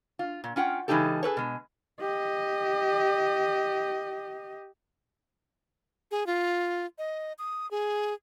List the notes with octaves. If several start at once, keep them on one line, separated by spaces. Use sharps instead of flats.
F4
A#2
C#4 F4 F#5 G5
C#3 E3 G#3 D#4 G4 A4
G#4 A4 B4 C#5
B2 G#3
G4 D#5
G#4
F4
D#5
D#6
G#4